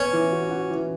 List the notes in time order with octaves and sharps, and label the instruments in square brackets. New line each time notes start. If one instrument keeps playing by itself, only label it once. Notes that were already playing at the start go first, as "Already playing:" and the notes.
Already playing: [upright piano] B3 [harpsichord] C#4
[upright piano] E3
F#4
F#4
E3